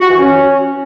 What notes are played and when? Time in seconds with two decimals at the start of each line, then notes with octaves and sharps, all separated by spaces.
0.01 F#4
0.10 E3
0.19 C#4